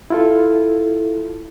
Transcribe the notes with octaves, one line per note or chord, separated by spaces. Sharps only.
E4 F4 A4